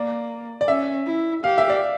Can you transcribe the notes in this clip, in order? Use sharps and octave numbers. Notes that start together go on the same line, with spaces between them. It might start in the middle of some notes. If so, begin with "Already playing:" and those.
Already playing: A#3 D5
D5
C#4 E5
E4
G4 F5
E5
D5